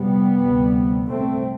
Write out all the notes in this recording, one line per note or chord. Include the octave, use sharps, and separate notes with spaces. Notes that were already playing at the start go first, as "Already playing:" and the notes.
Already playing: F2 C3 G3 B3
D2 C3
C2 C3 A3 C4